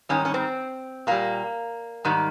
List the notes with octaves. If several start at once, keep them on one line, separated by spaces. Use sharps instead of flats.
G#2 D#3 G3 C#4
C#4
C4
A#2 G3 A#3
G#2 D#3 G3